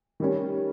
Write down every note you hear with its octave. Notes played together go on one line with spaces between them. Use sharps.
D#3 G3 C#4